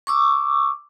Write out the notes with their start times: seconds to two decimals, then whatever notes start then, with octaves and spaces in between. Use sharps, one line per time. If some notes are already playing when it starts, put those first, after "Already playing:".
0.07 C#6 D6 E6